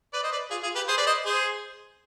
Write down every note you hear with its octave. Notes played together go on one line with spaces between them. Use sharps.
B4 D5
C5 D#5
B4 D5
F4 G#4
F4 G#4
G4 B4
G#4 C5
B4 D5
C5 D#5
G#4 C5